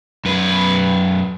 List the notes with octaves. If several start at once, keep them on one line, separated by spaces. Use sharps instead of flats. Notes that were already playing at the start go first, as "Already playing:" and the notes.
F#2 B4